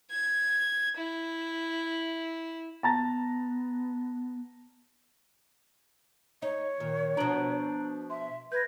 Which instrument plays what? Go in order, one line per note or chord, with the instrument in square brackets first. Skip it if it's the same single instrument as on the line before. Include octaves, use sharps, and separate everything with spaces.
[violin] G#6
E4
[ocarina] B3 [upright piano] A5 A#5 A6
[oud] D#4 [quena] C#5
[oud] A#2 [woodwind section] D#3
[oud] B2 F3 [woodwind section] D4 [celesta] A#5 D7 F#7
[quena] E5 [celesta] C6
[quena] B4 [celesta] G6 G#6 A#6